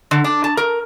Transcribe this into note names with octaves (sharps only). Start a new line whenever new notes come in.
D3
D4
A5
A#4